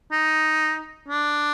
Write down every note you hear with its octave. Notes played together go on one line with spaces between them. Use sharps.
D#4
D4